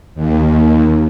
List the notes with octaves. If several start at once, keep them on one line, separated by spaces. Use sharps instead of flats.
D#2